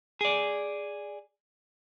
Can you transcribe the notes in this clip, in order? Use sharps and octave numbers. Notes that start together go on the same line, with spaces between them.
G#4 D5